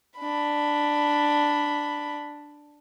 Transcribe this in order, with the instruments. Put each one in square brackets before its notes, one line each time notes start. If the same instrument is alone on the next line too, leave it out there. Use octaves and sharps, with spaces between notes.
[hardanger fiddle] D4 B5